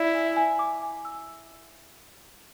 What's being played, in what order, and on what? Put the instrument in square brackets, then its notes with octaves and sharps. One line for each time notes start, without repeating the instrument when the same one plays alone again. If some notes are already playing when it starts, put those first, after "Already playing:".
Already playing: [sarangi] E4 [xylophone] D5
[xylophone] G#5
G#5
D6
G#5
E6